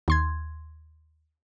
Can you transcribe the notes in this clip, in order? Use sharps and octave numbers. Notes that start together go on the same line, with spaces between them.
D#2 C6 G#6